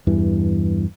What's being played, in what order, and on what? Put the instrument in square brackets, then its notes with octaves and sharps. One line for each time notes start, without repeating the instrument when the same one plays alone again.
[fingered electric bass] E2 G2 E3